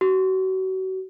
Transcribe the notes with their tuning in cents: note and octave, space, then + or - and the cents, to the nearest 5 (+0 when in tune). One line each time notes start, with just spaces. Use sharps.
F#4 +35